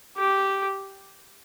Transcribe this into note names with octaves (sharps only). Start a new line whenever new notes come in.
G4